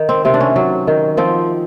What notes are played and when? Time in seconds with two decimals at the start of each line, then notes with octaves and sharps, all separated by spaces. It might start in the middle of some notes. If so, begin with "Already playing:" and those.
Already playing: D#3
0.09 C4
0.25 C3 C4
0.34 D4
0.40 C#4
0.56 F#3
0.87 D#3
1.17 F3 C4